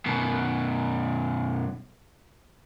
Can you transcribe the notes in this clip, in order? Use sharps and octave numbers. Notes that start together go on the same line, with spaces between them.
F#2 B2